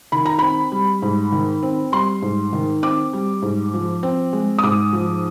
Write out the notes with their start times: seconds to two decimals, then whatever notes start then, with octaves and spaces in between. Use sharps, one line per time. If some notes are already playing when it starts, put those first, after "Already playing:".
0.12 D#3 B5
0.26 A#5
0.39 C4 B5
0.72 G3
1.02 G#2
1.32 D#3
1.63 C4
1.92 G3 C6
2.22 G#2
2.53 D#3
2.82 C4 D6
3.13 G3
3.42 G#2
3.74 F3
4.03 C4
4.33 G#3
4.59 D#6
4.63 G#2 D6
4.93 F3